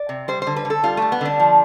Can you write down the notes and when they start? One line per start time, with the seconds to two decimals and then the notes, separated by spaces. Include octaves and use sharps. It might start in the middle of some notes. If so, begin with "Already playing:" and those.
Already playing: D5
0.09 C3
0.28 G3 C5
0.42 D3 C5
0.56 B4
0.65 D3
0.70 A4
0.83 G3 F4
0.97 G3 A3
1.12 B3
1.21 D3 D4
1.40 F3